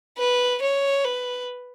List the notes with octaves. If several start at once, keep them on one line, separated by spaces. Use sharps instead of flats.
B4
C#5
B4